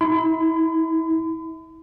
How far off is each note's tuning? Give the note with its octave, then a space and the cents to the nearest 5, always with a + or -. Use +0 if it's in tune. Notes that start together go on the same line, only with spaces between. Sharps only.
E4 -35 B5 +45